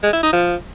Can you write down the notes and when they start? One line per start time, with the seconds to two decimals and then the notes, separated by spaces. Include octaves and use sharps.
0.03 G#3
0.13 E4
0.23 D#4
0.33 F3